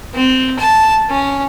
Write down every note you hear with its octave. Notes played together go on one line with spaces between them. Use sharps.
C4
A5
C#4